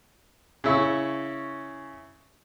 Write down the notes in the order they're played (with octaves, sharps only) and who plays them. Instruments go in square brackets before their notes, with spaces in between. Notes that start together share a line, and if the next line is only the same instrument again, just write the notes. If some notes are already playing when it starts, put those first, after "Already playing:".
[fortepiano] C#3 E4 C#6